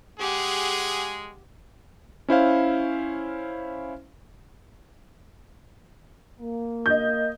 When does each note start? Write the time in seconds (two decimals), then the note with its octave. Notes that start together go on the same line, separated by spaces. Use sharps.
0.20 G#3 G4 G#4 F#5
2.28 C#4 E4 C5 F5
6.41 A#3
6.86 D#5 G6